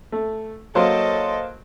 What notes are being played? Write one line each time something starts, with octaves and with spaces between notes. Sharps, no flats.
A3
F#3 A#3 A4 C5 C#5 D#5 C6